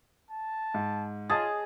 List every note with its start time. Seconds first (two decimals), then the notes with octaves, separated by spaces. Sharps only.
0.30 A5
0.74 G#2
1.30 F4 G#4 D#5 A5 A6